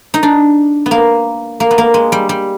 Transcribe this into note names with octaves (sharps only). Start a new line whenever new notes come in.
D#4
D4
B3
A#3
A#3
B3
A#3
G#3
G3
G3